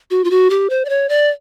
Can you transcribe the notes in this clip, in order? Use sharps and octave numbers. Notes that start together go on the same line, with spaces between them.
F#4
F4
F#4
G4
C5
D5
C#5
D5